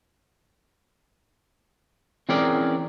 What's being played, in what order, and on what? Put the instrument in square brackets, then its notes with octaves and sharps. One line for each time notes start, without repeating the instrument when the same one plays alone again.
[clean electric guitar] E3 C4 C#4 G#4 A#4 D5